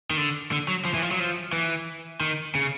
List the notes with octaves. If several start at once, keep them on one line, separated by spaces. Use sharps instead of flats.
D#3
D3
D3
F#3
F3
E3
F3
F#3
F3
E3
D#3
C#3